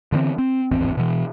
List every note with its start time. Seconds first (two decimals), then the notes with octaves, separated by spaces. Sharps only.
0.12 D3 E3 G3 C4
0.39 C4
0.71 D1 G#1 E2 C4
0.97 B2 E3